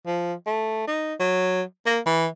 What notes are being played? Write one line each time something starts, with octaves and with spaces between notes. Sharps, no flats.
F3
A3
D#4
F#3
A#3
E3